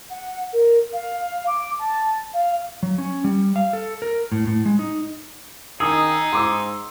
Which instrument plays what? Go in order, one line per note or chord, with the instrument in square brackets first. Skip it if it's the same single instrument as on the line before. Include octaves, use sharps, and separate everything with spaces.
[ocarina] F#5
A#4
F5
D6
A5
F5
[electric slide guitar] F#3
C#4
G3
F5
A4
A#4
A2
A2
G#3
D#4
[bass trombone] D#3 [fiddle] D#4 [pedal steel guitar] G#4 [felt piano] D#6 E6
[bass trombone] G#2 [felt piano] C6 D6 E6